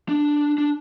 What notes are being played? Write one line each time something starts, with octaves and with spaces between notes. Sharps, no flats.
D4
D4